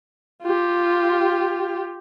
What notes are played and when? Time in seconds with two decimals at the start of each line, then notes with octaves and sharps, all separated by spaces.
0.43 F4 G4